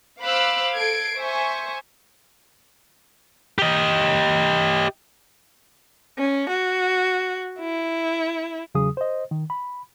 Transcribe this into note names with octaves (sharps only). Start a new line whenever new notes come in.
C5 F5 B5 D6 E6 F#6
A4 G#6 C7 D7
C5 E5 G#5 C#6
G4 D#5
C#4
F#4
E4
E2 C#3 F#3 G#4 D#6
C5 D#5
D#3
B5